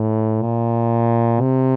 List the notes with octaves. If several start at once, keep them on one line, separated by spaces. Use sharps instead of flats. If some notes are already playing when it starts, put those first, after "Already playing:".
Already playing: A2
A#2
C3